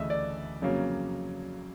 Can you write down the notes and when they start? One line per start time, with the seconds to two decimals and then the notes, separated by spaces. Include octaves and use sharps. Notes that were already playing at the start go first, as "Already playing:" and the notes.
Already playing: D2 C#3 E3 A3 D#5 E5
0.10 D5
0.61 F2 C#3 F#3 A#3 C#4